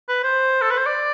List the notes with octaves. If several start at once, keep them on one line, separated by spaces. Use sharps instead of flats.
B4
C5
A4
B4
C5
D5